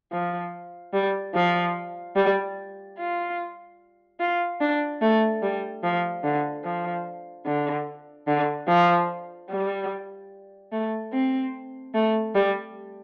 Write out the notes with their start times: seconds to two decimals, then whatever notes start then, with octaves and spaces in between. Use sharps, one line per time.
0.12 F3
0.93 G3
1.35 F3
2.16 G3
2.98 F4
4.20 F4
4.61 D4
5.01 A3
5.42 G3
5.83 F3
6.24 D3
6.64 F3
7.46 D3
8.27 D3
8.68 F3
9.50 G3
10.72 A3
11.13 C4
11.94 A3
12.35 G3